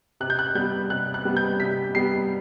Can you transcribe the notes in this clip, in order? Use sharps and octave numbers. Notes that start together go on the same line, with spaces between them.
C3 F#6
G6
F#6
G3 B3 G6
C3 F#6
F#6
G3 B3
G6
C3 B6
G3 B3 C7